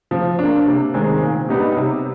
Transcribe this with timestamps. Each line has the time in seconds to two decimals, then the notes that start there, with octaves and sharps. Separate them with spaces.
0.11 F3
0.39 A#3 D4
0.66 C3
0.94 D#3 G#3 C4
1.21 A#2
1.49 G3 B3 D#4 G4
1.76 C3